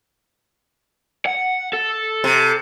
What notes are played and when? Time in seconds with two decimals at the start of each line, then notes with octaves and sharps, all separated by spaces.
1.26 F#5
1.73 A4
2.24 C3